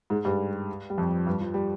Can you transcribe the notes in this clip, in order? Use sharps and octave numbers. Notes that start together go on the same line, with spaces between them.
G#2 G#3
G2 G3
G3
F2 F3
G2
F3
G3